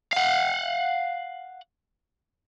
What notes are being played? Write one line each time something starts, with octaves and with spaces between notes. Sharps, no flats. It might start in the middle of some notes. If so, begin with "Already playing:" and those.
F5 F#5